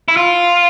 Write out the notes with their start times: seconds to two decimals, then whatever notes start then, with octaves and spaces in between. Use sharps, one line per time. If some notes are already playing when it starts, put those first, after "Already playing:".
0.08 E4
0.17 F4